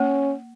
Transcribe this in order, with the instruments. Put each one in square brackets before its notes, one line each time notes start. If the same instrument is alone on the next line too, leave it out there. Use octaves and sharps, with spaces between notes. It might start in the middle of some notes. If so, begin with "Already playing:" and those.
Already playing: [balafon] A#3 [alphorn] C#4